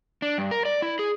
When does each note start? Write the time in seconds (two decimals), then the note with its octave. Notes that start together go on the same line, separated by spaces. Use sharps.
0.22 D4
0.38 G2
0.51 A#4
0.65 D5
0.82 E4
0.99 G#4